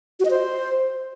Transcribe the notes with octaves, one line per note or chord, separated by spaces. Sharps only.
F#4
D#5
C5